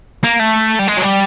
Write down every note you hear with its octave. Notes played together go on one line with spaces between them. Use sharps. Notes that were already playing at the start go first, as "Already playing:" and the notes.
A#3
A3
G3
G#3
F#3
G3